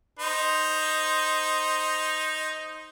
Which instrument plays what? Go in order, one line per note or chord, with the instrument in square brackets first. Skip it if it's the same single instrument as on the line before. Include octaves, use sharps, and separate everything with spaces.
[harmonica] D#4 C5